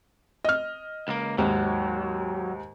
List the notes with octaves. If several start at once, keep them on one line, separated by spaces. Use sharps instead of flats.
D#5 F6
C#2 A#3
D#2 G#2 F#3